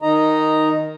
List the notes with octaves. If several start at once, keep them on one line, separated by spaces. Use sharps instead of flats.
D#3 D#4 D#5 A#5